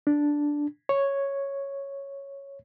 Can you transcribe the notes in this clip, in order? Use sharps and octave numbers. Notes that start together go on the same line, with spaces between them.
D4
C#5